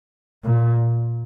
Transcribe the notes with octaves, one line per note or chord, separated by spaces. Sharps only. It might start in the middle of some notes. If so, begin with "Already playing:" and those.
A#2